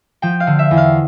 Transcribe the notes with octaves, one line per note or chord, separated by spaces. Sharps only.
F3 G5
F5
D3
E5
E2
F5